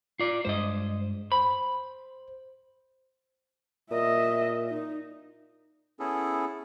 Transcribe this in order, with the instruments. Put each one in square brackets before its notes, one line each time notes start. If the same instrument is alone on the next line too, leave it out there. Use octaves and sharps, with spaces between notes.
[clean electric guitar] F4 D5
[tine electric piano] G2 G#3 [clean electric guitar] C5 D#5
[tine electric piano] C5 [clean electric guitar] B5
[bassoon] A#2 [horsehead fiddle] D#5 E5
[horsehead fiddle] D#4
[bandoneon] B3 C#4 E4 G#4 A4